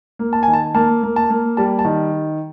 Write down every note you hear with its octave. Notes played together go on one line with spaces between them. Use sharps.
A#3
A5
D#3 G#5
A5
A#3 A5
A#3
A5
A#3
G3 A5
A5
D#3